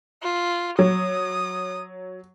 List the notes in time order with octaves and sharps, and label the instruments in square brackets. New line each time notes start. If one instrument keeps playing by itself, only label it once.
[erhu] F4
[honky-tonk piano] F#3 [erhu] D#6